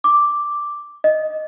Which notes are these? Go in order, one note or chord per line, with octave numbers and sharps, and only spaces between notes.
D6
D#5